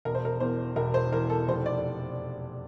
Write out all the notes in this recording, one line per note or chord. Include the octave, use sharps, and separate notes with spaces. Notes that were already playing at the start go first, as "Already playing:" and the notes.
E1 A#4
C5
A#4
E2 C5
E1 A#4
C5
E3 A#4
A4
F1 C5
D5